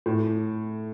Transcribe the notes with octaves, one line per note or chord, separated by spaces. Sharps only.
A2